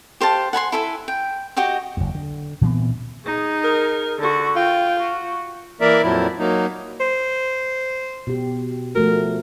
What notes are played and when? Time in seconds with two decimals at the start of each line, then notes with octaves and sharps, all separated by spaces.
0.21 G4 C5 F5 A5
0.53 F#5 G#5 B5 C6
0.72 E4 A4 E5 G#5
1.08 G5
1.57 F#4 G4 D#5 G5
1.97 F#1 E2
2.15 D3
2.61 A#2 E3 B3 C4
3.26 D#4 G#4
3.64 A#4
4.19 D3 F#4
4.56 F4 G5
5.00 F#4
5.81 E3 A#3 A#4 D5 E5
6.02 F2 A#2 F3 F#3 E4
6.39 F#3 A#3 D#4
7.00 C5
8.27 B2 G4
8.95 F3 A3 F#4 A#4